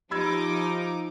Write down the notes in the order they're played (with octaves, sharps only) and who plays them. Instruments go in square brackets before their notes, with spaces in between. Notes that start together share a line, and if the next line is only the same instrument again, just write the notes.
[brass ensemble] F3 [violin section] D#4 D6 [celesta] G4 [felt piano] B5 E6 G#6